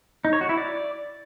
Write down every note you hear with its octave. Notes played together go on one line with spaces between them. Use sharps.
D#4
C#5
F#4
E4
D5